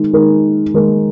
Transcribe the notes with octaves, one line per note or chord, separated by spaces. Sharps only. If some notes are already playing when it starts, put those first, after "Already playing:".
Already playing: D#3 G#3 D#4
D#3 G#3 D#4 A#4
D#3 G#3 D#4 A#4